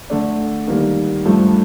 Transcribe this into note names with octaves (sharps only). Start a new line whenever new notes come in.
D3 A3 D4
D#3 G3 A#3
G2 F3 A3